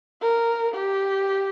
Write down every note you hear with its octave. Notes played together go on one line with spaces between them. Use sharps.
A#4
G4